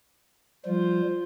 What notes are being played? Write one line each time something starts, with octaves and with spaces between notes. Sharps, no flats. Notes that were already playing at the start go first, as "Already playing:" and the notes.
F3 G3 F4 C5